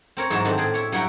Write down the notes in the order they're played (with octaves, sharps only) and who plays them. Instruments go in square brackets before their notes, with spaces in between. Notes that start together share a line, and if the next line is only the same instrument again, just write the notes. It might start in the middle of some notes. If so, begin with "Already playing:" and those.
[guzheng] C4 A#4 C#5
G#2 E3 F#3 C#5 A5 A#5
D#3 A3 C4 D4
A2 C4 G#4 D5
E4 C#5
G2 F#3 E4 F#5 G5 A#5